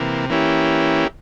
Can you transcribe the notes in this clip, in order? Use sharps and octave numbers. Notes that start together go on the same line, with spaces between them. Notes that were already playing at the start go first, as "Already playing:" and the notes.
Already playing: C3 E3 A#3
E3 A#3 C#4 E4 G4